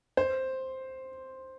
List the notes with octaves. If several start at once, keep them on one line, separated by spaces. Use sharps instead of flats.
C5